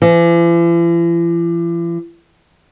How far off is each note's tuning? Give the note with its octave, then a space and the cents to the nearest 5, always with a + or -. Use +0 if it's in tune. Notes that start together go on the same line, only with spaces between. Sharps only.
E3 +45